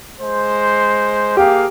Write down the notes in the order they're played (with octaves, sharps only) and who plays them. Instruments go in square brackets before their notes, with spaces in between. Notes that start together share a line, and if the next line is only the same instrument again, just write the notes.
[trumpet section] G#3 C5
[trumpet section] A#3 G#4 F5 [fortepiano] G4